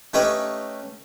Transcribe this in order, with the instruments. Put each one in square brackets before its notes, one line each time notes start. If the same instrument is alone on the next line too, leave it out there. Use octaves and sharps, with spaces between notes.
[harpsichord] A3 C#4 D#4 G4 B4 D#5